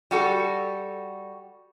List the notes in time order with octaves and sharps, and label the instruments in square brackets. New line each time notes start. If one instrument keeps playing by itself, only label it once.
[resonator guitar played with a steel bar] G3 F#4 A4